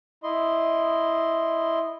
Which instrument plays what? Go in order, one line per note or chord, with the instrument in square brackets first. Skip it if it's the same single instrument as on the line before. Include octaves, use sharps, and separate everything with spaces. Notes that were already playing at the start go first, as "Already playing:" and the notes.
[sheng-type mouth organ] E4 D#5 C6